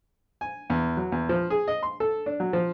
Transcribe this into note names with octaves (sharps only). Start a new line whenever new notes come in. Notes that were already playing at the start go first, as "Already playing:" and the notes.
G#5
E2
F#3
E2
F3
G#4
D#5
C6
A4
D4
F#3
F3